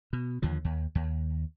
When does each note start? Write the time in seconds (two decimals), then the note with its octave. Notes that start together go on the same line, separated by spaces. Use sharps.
0.13 B2
0.42 D#2 D3 F3
0.65 D#2
0.95 D#2